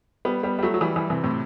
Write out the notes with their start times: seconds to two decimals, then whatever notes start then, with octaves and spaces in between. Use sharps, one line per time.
0.25 G3 B3
0.43 G3 B3
0.59 G3
0.63 F#3 A3
0.74 F#3
0.81 E3 G3
0.96 E3 G3
1.10 C3 E3
1.23 A2 C3